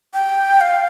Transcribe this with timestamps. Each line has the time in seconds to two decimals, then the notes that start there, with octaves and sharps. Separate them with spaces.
0.14 G5
0.61 F5